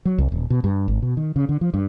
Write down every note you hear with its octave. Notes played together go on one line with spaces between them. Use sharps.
F#3
C2
D#1
B2
G2
G#1
B2
D#3
C#3
D3
F3
G2